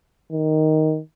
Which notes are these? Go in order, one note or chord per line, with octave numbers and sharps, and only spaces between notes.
D#3